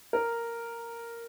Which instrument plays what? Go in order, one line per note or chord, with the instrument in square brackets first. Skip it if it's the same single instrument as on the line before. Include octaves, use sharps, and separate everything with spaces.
[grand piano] A#4